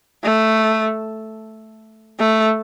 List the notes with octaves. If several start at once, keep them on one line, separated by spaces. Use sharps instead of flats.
A3
A3